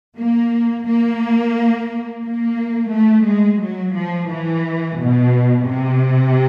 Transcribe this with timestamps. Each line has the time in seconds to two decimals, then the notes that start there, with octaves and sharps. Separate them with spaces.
0.18 A#3
0.87 A#3
2.25 A#3
2.93 A3
3.28 G#3
3.62 F#3
3.96 F3
4.31 E3
5.00 B2
5.69 C3